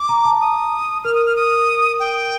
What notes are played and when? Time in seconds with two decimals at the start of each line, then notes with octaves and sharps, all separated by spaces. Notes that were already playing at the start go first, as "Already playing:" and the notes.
Already playing: D6
0.09 A#5
0.25 A5
0.41 D#6
1.04 A#4 F6
1.15 D#6
1.26 F6
1.36 D#6
2.00 G5